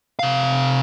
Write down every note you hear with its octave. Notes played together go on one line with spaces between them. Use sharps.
C3 F5